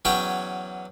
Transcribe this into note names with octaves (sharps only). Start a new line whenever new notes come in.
E2 F#3 C#4 G5 C#6